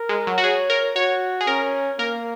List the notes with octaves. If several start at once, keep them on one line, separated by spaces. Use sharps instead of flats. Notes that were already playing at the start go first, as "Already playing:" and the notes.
Already playing: A#4
G#3
F#3
F#4
G#4 C#5
A#4
F#4 C#5
G#4
C#4 A#4
A#3 A#4